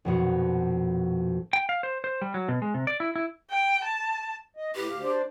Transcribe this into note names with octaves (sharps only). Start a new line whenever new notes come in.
A#1 F2 B2 F#4
G5
F5
C5
C5
G3
F#3
B2
G#3
C3
D5
E4
E4
G5
A5
D#5
A2 G4 B4
D2 F5
D4 C5 D5